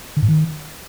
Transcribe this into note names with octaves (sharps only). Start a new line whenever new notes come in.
D3
G#2
D#3